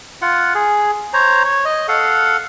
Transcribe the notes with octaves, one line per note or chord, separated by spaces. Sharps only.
F4 F#5
G#4
C5 C#5 A#5
C#5
D#5
A4 F5 F#5